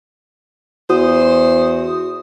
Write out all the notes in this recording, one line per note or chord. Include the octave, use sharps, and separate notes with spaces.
E2 F#4 C5 D#6